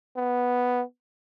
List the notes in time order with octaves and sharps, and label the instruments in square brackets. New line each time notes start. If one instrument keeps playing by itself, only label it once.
[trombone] B3